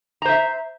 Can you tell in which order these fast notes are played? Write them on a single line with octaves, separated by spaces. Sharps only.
A#5 C5 E5